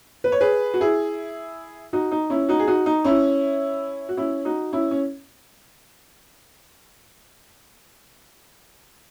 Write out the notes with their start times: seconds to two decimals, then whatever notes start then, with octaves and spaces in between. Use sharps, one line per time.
0.24 B4
0.32 C#5
0.41 G#4 B4
0.74 F#4
0.81 E4 G#4
1.93 D#4 F#4
2.11 D#4
2.30 C#4 E4
2.49 D#4 F#4
2.59 G#4
2.67 D#4 F#4
2.86 D#4
3.04 C#4 E4
4.09 F#4
4.17 C#4 E4
4.45 D#4 F#4
4.73 C#4 E4
4.91 C#4